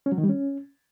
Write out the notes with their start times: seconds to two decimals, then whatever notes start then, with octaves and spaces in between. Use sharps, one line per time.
0.06 C#4
0.12 F#3
0.18 D#3
0.23 G3
0.29 C#4